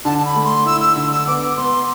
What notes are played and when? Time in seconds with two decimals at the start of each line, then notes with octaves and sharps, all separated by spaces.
0.05 D3 A5
0.18 A5
0.25 B5
0.36 A3
0.45 C6
0.65 E4 E6
0.81 E6
0.96 D3 E6
1.12 E6
1.27 B3 D6
1.57 B3 C6